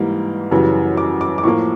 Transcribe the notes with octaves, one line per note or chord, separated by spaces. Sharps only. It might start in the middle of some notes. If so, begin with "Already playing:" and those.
Already playing: G#2 E3 G3 A#3
F#2 C#3 E3 G3
D6
D6
D6
A2 F3 A#3 C#6